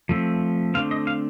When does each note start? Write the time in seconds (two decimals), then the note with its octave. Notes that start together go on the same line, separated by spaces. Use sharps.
0.09 F3 A3 C4
0.74 D3 A3 C4 F5
0.91 D#5
1.07 F5